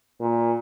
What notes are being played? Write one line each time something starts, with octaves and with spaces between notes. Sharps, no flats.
A#2